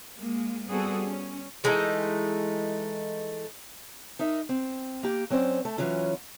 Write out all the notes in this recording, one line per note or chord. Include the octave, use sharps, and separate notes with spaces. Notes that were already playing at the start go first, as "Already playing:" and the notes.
G#3 A#3
G3 B3 C4 F#4 G#4 A4
C#4
E3 G#3 A3 D#4
D#4 A#4 E5
C4
A#3 G4
F#3 C4 C#4 C5 D5
A3 A4
E3 F#3 C#4 F4